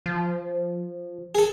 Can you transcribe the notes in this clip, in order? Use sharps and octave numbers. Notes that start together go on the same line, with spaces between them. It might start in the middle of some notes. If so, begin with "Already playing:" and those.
F3
G#4 A4